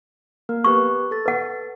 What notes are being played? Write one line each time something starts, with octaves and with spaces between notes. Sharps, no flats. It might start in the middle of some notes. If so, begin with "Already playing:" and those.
A#3 A#4
B3 G4 B4 C#6
A4 A6
B4 F#5